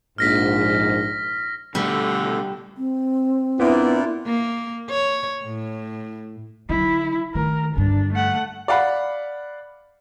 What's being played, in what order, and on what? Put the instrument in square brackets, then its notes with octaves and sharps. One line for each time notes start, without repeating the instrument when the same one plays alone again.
[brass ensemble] A#1 G#2 [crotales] F6 A#6 B6
[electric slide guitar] B2 A3 [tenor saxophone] D3 [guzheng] G3
[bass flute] C4
[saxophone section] A#2 D4 [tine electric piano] B3 [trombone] E4
[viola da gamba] A#3
C#5
A2
[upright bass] D3 F#3 [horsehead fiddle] E4
[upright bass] D#3 A3 [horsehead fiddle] A#4
[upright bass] G2 D3 [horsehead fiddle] D4
[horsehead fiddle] A3 F#5
[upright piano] D5 F5 F#5 B5